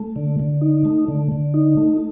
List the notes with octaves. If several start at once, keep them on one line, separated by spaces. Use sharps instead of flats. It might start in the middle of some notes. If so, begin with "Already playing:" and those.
Already playing: A3
D3
D3
D#4
A3
D3
D3
D#4
A3